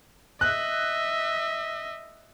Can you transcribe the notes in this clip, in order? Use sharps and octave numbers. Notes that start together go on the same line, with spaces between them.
D#5 E5 F#6